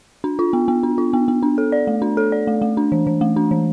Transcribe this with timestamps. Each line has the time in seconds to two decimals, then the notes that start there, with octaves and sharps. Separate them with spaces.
0.24 D4
0.39 F4
0.53 B3
0.68 B3
0.83 D4
0.98 F4
1.13 B3
1.28 B3
1.43 D4
1.58 A4
1.72 D5
1.87 A3
2.02 D4
2.17 A4
2.32 D5
2.47 A3
2.62 A3
2.77 D4
2.92 E3
3.07 E3
3.21 A3
3.36 D4
3.51 E3